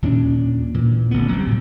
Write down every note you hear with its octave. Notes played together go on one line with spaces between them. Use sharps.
D#2 A#2 C#4 D4
A#2 E3
D1 A1 D3 B3
F#3 G3 C4
A2 C3